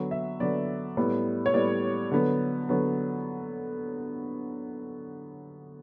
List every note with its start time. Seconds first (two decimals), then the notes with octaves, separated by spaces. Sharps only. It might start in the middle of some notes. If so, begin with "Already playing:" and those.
Already playing: D3 F#3 B3
0.11 E5
0.40 D3 F#3 B3 D5
0.97 A2 G3 B3
1.46 C#5
1.54 A2 G3 B3 D5
2.11 D3 F#3 B3
2.69 D3 F#3 B3